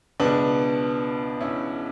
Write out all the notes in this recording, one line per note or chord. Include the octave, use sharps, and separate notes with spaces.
C#2 B2 B3 D4
C#4 E4